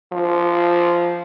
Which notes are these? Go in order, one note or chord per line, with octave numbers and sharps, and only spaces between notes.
F3